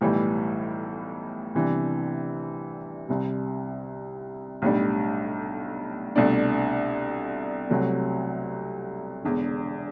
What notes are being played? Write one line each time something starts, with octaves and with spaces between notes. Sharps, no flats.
B1 A2 E3 G3
C2 C3 E3 B3 D4
C2 C3 G3
B1 A2 G3 D4
C2 B2 A3 D4
C2 C3 F#3 A3
E1 E2 D3